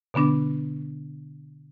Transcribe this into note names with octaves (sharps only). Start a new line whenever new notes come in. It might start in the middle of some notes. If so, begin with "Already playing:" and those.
B2 D3 B3 D4 D6